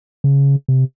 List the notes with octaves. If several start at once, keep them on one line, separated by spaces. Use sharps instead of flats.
C#3
C3